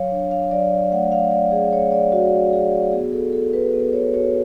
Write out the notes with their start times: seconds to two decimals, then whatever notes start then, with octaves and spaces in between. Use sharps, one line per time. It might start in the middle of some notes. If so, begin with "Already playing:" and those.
Already playing: F#3 C#5 F5
0.12 D4
0.31 F5
0.51 F#3 D5
0.91 A3 F#5
1.12 F5
1.31 F#3 D5
1.52 G#4
1.73 A3 C#5
1.92 D5
2.12 F#4
2.53 F#4 G#4
2.92 B3 G#4
3.13 A4
3.33 F#4 A4
3.53 B4
3.73 B3
3.93 C#5
4.14 F#4 C#5